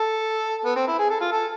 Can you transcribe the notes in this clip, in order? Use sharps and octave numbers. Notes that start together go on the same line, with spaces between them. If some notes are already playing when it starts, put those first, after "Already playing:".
Already playing: A4
B3
C4
E4
G#4
A4
F4
A4